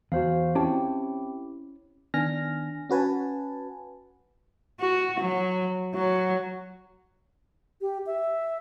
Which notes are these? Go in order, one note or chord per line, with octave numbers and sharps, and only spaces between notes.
E2 F#4 C5 F5
C4 C#4 E4 G4 G5 A5
D#3 B3 D4 G#5 F6 A#6
C#4 F#4 B4 G#5 A5
F#4
F#3
F#3
G4
E5